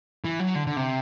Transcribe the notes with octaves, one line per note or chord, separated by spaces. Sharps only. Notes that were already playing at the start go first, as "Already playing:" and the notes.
E3
F#3
D3
D3
C3